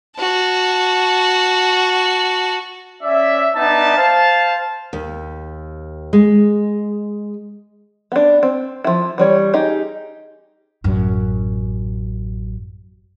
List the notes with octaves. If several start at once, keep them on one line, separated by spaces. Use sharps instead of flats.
F#4 A5
C#4 D5 E5
B3 D4 D#4 E5 A5
C5 F5 A5
D#2
G#3
B3 D4
C4
F3 E4
E3 G3 C#5
D#4 G4 G#4
A1 F#2